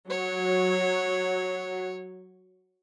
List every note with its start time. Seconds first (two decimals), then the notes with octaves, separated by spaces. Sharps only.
0.10 F#3 C#5